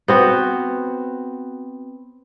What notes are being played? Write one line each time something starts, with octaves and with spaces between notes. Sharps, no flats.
B3 C4 F#4